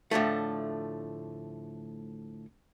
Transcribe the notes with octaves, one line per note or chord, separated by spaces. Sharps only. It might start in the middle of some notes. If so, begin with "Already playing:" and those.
A2 D3 F3 A3